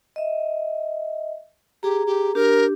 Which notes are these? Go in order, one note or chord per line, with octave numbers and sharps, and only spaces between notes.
D#5 E5
G4 G#4 A#5
G4
D4 G4 A#4